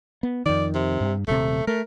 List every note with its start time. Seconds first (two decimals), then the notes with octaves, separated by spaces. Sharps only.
0.23 B3
0.46 F2 D#3 D5
0.75 C3
1.01 G2
1.28 D#1 C3 A3
1.67 A3 A#4